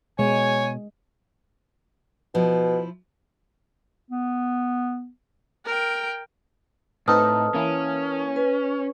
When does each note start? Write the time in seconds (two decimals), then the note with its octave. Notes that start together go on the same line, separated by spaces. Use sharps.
0.19 B2 G#3 C#5 G#5
2.35 B2 F3 E4
4.10 B3
5.65 A#4 G5
7.08 A2 C4 D#4 A4 B4 A5 D#6 F6
7.54 E3 A#3 C#4
8.36 B4